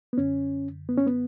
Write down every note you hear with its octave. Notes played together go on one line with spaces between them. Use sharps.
B3
F#2 D3 C#4
B3
C#4
B3